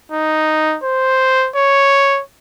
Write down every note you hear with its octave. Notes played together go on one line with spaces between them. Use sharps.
D#4
C5
C#5